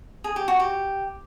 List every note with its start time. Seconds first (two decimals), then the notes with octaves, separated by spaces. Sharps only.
0.24 G#4
0.36 G4
0.48 F#4
0.60 G4